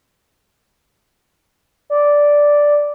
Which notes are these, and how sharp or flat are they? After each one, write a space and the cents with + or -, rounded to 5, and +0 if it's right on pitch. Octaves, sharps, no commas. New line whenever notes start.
D5 -5